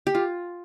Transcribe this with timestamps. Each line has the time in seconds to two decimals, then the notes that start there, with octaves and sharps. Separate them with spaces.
0.07 G4
0.15 F4